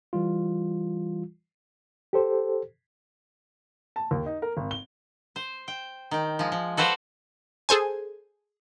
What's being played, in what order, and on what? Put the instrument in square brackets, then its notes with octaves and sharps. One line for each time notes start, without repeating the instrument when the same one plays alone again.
[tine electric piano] E3 G3 F4
[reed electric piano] G4 A4 C5
[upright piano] A5
D#2
D#4
A#4
G#1
G7
[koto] C5
G5
D#3 G5
F3 G#3
F3
F#4 A4 B4 C5 D5 F5
[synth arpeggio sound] G#4 A4 C5 G#5